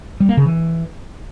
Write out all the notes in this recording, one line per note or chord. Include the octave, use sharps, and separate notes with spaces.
G3
A#3
C#3
E3